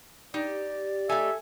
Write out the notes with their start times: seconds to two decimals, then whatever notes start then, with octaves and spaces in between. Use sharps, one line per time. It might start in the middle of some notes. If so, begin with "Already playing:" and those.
0.34 D#4 G4 D5
1.09 A3 D#4 G4 A4 E5 G#5